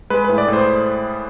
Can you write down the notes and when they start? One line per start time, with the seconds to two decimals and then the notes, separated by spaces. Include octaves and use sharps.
0.10 G#3 B4
0.24 A2 B4
0.38 D5
0.48 A2 C5